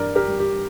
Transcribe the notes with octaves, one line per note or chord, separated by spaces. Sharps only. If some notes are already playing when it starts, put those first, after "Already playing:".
Already playing: G2 E3 A#4 D5
G4 A#4
G3
G4